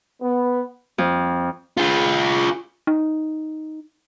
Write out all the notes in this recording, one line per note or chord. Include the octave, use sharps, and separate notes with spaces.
B3
F2
F4 G#4
D#4